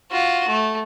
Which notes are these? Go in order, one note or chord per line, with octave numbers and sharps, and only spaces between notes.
F4 F#4
A3